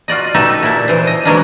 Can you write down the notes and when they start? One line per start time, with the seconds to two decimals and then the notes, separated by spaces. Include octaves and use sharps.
0.08 F4 F#4 D5 D#5
0.34 D#4 F#4 G4 A4 B4 E5
0.63 A#2 E4 E5 A5
0.88 E3 C5
1.07 D#5
1.25 E3 F#3 G#3 A#3 C#4 D4